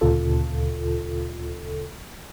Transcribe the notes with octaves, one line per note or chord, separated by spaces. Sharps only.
D2 A#2 C#3 F4 A4